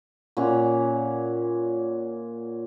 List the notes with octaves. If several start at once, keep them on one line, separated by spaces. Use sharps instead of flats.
A#2 C#4 F#5 C#6